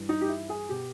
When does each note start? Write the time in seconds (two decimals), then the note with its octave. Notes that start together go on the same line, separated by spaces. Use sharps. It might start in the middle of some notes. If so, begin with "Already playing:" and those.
Already playing: G2 E3
0.09 D#4
0.21 G4
0.29 E4
0.49 G#4
0.69 B2 G4